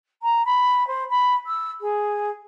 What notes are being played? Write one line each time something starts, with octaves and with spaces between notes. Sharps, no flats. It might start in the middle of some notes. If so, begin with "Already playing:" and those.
A#5
B5
C5
B5
E6
G#4